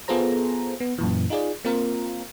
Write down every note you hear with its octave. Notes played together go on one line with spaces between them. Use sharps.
B3 F4 G#4 A4 C5 A#5
B3
F#2 A#2 E3
D#4 F4 G#4 D5
A#3 C4 F4 A#4